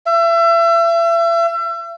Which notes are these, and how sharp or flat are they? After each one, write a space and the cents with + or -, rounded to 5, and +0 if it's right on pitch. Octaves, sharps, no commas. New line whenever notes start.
E5 +35